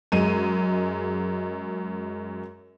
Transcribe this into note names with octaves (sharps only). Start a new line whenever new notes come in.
F#2 G#3 D#7